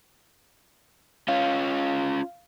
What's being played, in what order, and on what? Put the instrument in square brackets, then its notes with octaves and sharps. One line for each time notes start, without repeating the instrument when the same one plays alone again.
[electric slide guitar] C#4 F4 [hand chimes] F5